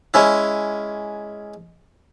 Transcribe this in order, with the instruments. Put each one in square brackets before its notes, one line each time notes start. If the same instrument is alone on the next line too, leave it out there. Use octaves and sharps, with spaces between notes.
[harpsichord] G#3 C#4 E4